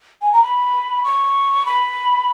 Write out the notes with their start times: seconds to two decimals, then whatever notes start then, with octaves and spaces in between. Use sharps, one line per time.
0.22 G#5
0.33 A#5
0.43 B5
1.04 C#6
1.66 B5